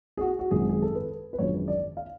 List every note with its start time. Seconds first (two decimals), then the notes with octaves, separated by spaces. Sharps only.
0.17 G#4
0.21 F#4
0.39 F#4
0.51 G#1 F#2 F3 G#3 G#4
0.69 G#4
0.82 A4
0.95 B4
1.33 B4
1.38 G#1 F#2 D3 F3 G#3 C#5
1.68 D5
1.97 F5